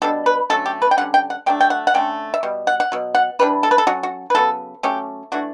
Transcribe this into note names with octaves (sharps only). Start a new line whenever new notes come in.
B2 G3 D4 A4
B4
D3 F#3 A3 C#4 A4
G4
B4
G5
D3 G3 C#4 F#5
G5
F#5
F#3 A3 D4 G5
G5
F#5
F#5
D3 A3 C#4 G5
E5
B2 G3
F#5
F#5
B2 F#3
F#5
E3 G3 D4 B4
A4
B4
A4
F#3 C#4 F#4
F#4
B4
C#3 F#3 B3 A4
F#3 A3 C#4 G4
E3 A3 D4 F#4